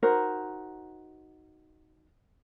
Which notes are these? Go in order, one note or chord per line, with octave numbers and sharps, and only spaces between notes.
D#4 F#4 A#4 C5